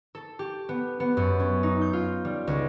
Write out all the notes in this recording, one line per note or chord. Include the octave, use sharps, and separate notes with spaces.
A4
G4
B3
B3
F#2
C#4
D#4
G6
F4
G3
C#2